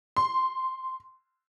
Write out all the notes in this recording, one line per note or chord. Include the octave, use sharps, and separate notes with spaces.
C6